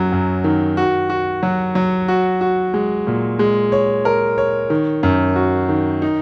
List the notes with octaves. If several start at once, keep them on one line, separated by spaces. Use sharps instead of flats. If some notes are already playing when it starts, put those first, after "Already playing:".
Already playing: F#2 F#3
F#2
D#3
F#4
F#4
F#3
F#3
F#4
F#4
G#3
A#2
G#3
C#5
A#4
C#5
D#3
F#2
F#4
D#3
D#4